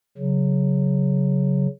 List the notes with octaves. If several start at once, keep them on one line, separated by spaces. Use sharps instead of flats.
C#3 F#3